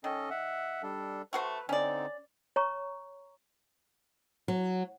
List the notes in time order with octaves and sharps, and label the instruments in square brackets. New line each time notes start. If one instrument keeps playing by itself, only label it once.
[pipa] D#3 [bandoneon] C#4 A4 D#5
[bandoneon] E5 F#5
G3 D4 A4
[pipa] A3 F#4 C5 [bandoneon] B4
[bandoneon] D3 C4 D#4 [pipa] C#4 D5
[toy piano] C#5 A#5 C#6
[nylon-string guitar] F#3